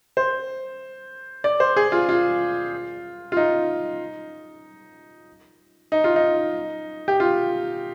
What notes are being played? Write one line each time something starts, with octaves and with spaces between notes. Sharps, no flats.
C5
D5
C5
G#4
F4
F4
F4
D#4
D#4
F4
D#4
G4
F4